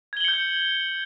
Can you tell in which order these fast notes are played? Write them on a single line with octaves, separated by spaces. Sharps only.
G#6 G7 F#7 C#7 G6